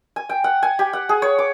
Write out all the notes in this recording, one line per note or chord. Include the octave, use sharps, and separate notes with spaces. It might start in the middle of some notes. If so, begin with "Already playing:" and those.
G#5
G5
F#5
G#5
G4
F#5
G#4
C#5
D6